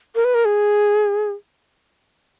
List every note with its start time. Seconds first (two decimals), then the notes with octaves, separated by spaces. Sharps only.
0.15 A#4
0.25 B4
0.35 A#4
0.45 G#4